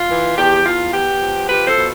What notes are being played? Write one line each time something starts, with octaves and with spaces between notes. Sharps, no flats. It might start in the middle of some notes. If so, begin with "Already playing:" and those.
Already playing: F4
E3
E2 G4
E2 F4
B3 G4
F3
F4 G4 B4
A4 C5
B2